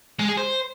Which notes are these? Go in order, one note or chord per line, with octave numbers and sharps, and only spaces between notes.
G#3
G#4
C5